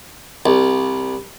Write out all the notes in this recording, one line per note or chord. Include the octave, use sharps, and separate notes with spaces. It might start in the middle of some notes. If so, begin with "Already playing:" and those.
C2